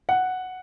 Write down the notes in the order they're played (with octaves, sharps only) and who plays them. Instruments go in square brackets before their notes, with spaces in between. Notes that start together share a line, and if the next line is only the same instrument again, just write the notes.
[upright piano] F#5